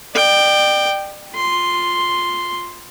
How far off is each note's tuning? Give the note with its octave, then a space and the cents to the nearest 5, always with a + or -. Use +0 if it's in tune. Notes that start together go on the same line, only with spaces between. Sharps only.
D5 +40 G5 +0
F4 +10 C6 +0